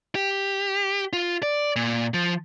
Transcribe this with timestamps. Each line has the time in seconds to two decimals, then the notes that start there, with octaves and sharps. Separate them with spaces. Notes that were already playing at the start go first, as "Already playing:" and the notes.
0.15 G4
1.13 F4
1.43 D5
1.76 A#2
2.14 F3